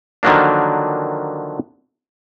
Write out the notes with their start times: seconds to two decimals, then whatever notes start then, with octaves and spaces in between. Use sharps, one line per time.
0.23 D3 D#3 F3 F#3 A#3 D4